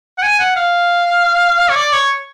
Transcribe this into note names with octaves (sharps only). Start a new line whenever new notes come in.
F#5
G#5
F#5
F5
C#5
D5
C#5